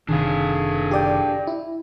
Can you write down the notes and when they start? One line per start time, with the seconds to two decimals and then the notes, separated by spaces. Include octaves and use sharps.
0.09 F#1 A2 C3 D#3 D4 G#4 F5
0.91 G4 D5 G5
1.47 E4